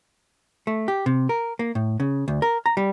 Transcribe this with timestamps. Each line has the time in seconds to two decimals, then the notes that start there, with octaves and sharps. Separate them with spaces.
0.67 A3
0.88 G4
1.06 C3
1.29 A#4
1.59 A#3
1.75 A2
2.00 C#3
2.28 D2
2.42 A#4
2.66 A#5
2.77 G3